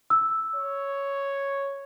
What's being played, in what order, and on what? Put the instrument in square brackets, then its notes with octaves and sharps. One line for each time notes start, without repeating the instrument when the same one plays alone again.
[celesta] E6
[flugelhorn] C#5